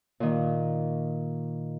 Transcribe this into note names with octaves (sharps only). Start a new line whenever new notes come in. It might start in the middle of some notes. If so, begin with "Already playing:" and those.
A#2 D#3